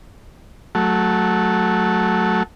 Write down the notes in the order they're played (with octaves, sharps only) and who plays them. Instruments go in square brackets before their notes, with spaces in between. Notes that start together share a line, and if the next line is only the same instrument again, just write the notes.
[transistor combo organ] F#3 A3